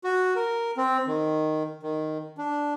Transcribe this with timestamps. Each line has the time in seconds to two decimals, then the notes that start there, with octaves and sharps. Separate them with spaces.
0.04 F#4
0.36 A#4
0.77 C4
1.07 D#3
1.83 D#3
2.38 D4